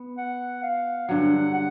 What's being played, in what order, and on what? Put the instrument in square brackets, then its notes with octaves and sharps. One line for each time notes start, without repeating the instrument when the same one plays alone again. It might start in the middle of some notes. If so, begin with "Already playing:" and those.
Already playing: [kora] B3
[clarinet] F#5
F5
[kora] G2 D3 F#3 [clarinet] F#5
[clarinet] F#5